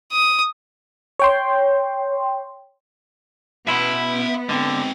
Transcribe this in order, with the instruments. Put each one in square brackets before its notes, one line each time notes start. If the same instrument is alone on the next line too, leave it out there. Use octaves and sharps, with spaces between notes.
[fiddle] D#6
[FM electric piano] C#5 G5 C6
[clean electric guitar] B2 E4 [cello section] B3 [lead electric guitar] E5 C6
[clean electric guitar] D3 [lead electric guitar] G#3 C4